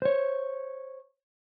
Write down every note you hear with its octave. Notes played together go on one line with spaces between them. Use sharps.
C5 C#5